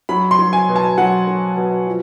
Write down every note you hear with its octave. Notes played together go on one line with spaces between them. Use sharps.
F#3 B5
C6
F#3
G#5
B2
A5
F#3 F#5
F#3
B2
F3